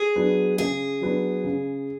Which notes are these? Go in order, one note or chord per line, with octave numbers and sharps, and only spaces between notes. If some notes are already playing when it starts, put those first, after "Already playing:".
Already playing: G#4
F#3 B3 D4
C#3 G#4
F#3 B3 D4
C#3